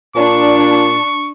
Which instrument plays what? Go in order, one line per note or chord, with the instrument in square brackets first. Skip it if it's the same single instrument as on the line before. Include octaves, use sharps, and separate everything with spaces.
[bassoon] A#2 [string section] D4 [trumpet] C#6